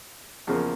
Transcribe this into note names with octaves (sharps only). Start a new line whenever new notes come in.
E2 C#3 F3 A#3